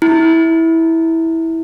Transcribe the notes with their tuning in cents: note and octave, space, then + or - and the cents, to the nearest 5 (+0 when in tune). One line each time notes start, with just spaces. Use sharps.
E4 -15